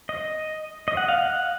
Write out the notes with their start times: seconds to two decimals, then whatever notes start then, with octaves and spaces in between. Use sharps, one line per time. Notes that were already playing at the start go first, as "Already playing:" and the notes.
0.09 D#5
0.88 D#5
0.97 F#5
1.08 F5
1.18 F#5